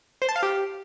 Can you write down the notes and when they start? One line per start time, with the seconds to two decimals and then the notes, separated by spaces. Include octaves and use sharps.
0.22 C5
0.29 A5
0.36 F5
0.43 G4